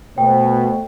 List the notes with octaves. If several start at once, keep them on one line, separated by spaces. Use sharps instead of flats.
B2 A3 C5 G5